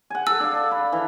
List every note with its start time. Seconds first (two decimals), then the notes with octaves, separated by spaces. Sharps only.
0.10 F#5 G#5
0.27 A4 E6
0.40 D4 F5
0.71 B5
0.92 E3